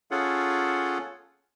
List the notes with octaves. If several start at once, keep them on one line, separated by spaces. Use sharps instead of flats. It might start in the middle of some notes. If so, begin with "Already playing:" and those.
C#4 F4 G#4 A4 F#5